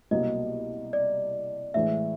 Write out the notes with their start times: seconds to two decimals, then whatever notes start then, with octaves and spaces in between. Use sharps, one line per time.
0.11 C2 B2 F#3 A#3 D#5
0.93 D5
1.74 A2 E3 G#3 E5